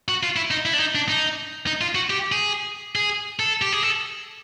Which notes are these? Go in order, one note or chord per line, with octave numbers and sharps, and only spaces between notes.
F#4
F4
E4
D#4
E4
D4
D#4
D4
D#4
D#4
F4
F#4
G4
G#4
G#4
A4
G4
G#4
A4